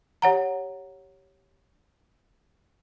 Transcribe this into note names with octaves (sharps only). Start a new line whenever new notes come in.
G4 C#5 F#5 A#5